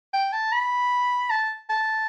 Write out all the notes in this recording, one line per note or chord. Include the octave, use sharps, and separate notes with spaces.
G5
A5
B5
A5
A5